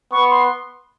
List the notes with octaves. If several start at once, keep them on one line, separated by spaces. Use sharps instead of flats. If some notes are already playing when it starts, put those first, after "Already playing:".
B3 C#6
C6